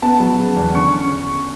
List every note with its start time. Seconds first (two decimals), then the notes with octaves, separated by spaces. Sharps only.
0.02 B3 A5
0.20 F#3
0.38 C#3
0.56 E2
0.75 D3 C#6
0.93 C#4